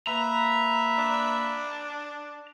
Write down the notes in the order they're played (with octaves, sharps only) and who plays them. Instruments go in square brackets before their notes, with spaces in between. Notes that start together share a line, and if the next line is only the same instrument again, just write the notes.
[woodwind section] A#3 B4 B5 [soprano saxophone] E5 [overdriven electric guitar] A#5
[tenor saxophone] D4